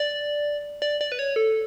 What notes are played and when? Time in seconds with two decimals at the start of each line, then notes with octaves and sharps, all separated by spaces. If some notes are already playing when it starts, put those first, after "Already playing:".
Already playing: D5
0.82 D5
1.01 D5
1.12 B4
1.19 C#5
1.36 A4